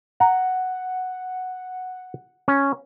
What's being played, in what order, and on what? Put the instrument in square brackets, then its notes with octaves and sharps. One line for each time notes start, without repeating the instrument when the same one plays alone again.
[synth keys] F#5 [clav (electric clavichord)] A#5
[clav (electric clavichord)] C#4